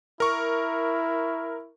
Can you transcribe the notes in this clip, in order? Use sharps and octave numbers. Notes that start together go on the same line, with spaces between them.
E4 A#4 C#6